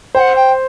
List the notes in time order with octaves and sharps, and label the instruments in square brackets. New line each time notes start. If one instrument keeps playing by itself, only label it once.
[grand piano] C5 [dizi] G5
[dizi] F#5
G5